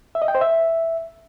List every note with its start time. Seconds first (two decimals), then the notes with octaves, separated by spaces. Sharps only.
0.15 E5
0.22 D#5
0.28 G5
0.35 C5
0.41 E5